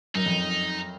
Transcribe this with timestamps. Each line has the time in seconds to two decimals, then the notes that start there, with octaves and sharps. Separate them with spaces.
0.15 F#2 D#4
0.26 F2